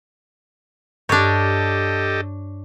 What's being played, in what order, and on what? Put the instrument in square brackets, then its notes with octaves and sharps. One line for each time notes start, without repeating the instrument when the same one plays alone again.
[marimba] G2 [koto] D4 C#5 [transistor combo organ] G4 A4 D#5